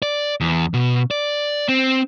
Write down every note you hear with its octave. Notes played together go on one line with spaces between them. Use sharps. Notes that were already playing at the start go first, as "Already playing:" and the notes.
D5
E2
B2
D5
C4